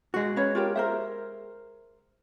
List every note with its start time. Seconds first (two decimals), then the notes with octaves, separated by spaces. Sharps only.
0.14 G#3 F#4
0.36 C#4 B4 C#5
0.55 F4 G4 A#4
0.75 A#4 C5 E5